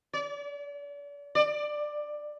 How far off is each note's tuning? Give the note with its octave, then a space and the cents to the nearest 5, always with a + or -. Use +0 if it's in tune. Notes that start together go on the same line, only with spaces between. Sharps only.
D5 -40
D5 +15